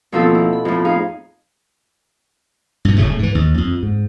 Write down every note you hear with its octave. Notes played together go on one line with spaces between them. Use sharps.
D#2 B2 F3 C4 F4 A4
E4
B5
F2 A2
D#4 G#4 F5
G2 A#2
D1 A2 C#3 A3
G#2 E3
D#2
F2
G#2